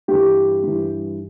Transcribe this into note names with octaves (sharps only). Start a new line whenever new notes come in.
G2 E3 G3 G4
G2 E3